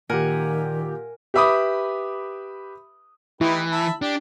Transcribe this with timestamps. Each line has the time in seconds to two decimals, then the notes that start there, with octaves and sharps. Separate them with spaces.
0.09 A#2 D#3 G4 A#4 F#5 G#5
1.34 G4 B4 E5 B5 D6 D#6
3.41 E3 D#4 E4 G4 B4
3.72 E5 A5 B5
4.02 D4 G4